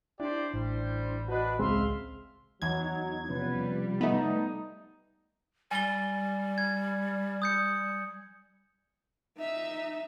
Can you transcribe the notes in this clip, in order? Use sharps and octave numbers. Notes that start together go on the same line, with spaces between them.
D4 E4 G4 C5 D5
A1 G3 C5
D4 F#4 B4 D#5
C#2 G#3 C4 G#4 E5 F5 C6
E2 F#3 D#4 G#6
C3 F3 G3 B3 C#4 B4
A3 B3 D#4
G3 G#5 A6 G7
G#6
D#6 G6 C#7
D#4 E5